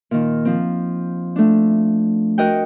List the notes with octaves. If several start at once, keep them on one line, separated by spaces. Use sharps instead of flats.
A#2 D#3
F3 C4
A3 D4
F#4 A#4 D#5 F#5 G5